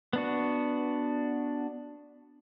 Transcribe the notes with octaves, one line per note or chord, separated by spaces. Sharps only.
B3 D4 F#4